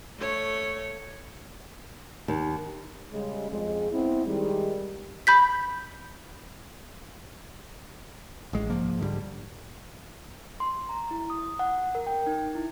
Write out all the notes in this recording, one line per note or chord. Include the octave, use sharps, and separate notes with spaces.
A3 C#5
D#2
C#3 G3 G#3
F2 G#3
B3 C4 E4
D#3 G3 G#3
B5 G6 B6
A1 G#3
C2 G#2 F3 A#3
G#2 D3 E3 G3
C6
A#5
E4
D#6
F#5
A#4
G5
D#4
E4